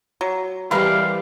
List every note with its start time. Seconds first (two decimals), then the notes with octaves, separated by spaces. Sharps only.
0.21 F#3
0.71 E3 G3 A3 C4 A#4 B4 F5